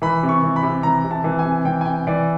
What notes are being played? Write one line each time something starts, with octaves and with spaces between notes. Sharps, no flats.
E3 B5
C3
C#6
E3
B5
C3
E3 A#5
C3
A5
E3
G#5
C3
E3 G5
G#5
C3 G5
E3 D5